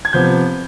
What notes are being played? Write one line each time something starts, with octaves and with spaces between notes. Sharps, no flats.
G#6
C3 F3 B3 G6